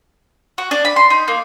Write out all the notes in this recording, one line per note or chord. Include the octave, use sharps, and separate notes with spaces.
F#4
D4
B5
C6
D#4
A#3